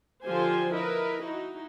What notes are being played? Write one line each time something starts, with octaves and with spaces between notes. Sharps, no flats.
D3 F3 F4 G4 C5 G#5
E4 A#4 B4 D#5
D#4 E4 F#4